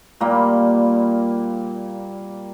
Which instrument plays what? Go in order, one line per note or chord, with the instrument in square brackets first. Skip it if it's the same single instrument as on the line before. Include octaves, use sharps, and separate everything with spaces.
[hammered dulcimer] A#2 G3 A#3 B5